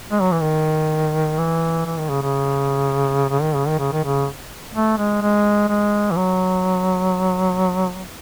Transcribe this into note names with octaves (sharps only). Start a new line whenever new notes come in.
G#3
F#3
E3
D#3
E3
E3
D#3
C#3
C#3
C#3
D#3
C#3
D#3
C#3
D#3
C#3
A3
G#3
G#3
G#3
E3
F#3